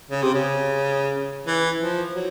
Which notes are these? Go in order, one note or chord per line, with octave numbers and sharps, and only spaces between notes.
C#3
C3
C#3
E3
F3
F#3